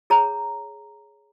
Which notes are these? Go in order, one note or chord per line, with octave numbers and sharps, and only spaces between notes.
G#4 C#5 A#5